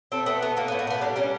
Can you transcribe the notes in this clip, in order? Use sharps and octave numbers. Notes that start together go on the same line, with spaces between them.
A3 C4
A3 B3
A3 B3
A3 A#3
A2 B3
A#3
A3
B3
G3 D4
G3 C#4